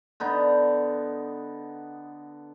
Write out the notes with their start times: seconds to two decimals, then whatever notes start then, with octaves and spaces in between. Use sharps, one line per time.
0.20 D3 B3 D#4